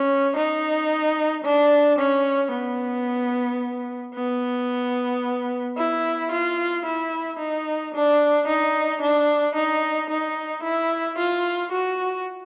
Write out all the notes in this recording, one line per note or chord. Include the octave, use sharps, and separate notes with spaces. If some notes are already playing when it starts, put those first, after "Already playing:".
Already playing: C#4
D#4
D4
C#4
B3
B3
E4
F4
E4
D#4
D4
D#4
D4
D#4
D#4
E4
F4
F#4